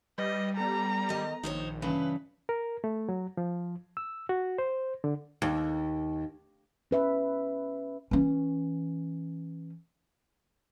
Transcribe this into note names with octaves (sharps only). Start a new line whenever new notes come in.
G3 B4 D#5
B3 A4 A#5
D#3 D#5
A#1 D#3 D#4 C5 C#5
G2 C#3 E3 B4
A#4
A3
F#3
F3
E6
F#4
C5
D3
D#2
C#4 B4 E5
E3 C#4